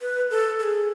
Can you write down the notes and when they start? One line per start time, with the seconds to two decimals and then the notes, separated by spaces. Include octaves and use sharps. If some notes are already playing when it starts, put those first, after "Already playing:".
0.01 B4
0.30 A4
0.59 A4
0.63 G#4